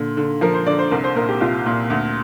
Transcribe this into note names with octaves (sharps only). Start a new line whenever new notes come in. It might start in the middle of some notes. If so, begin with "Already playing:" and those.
Already playing: A#2 D3
D3
F3 A#4
C5
D3 D5
C5
C2 A#4
C5
A#2 A#4
G4
C2 F4
A#2
D2